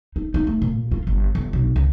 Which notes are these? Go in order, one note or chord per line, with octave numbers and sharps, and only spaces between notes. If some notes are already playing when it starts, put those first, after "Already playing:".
D#4
D#4
A3
A#2
F4
G1
G1
B1
C#2